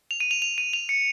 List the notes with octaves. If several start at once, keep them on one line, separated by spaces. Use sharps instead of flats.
F7
D#7
F7
F7
D#7
F7
C#7